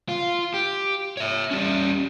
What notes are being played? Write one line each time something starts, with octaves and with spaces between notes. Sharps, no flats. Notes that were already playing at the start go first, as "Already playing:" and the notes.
F4
G4
C#5 E5
G3 C#4